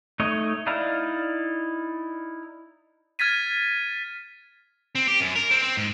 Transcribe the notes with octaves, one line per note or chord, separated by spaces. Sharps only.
A3 D#4 C#5 D#5
D#4 E4 D5 F5 A#5
F6 G#6 A6 B6 D#7
C4
G4
F#2
A#4
C4
C4
G#2